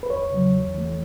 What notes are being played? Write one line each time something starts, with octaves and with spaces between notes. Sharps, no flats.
B4
E2 C#5
C#3 F#3
E2
E3 A3